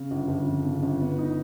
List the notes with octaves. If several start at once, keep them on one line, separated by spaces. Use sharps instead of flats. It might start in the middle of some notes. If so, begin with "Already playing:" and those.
Already playing: C#3
G1
G1
F2
C#3
G1
B3
D#4